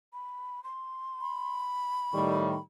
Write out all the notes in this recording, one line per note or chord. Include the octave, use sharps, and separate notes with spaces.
B5
C6
B5
A2 D#3 G3 C#6